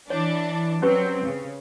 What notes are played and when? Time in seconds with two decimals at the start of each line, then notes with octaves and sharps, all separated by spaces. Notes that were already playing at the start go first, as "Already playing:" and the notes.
0.10 E3 D4 C#5
0.82 F#3 C4 C#4 G4 B4
1.24 C#3